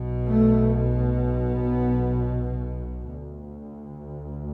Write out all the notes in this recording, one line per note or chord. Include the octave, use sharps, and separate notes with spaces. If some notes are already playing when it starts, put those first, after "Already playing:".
Already playing: B1 B2
A3
B3
D2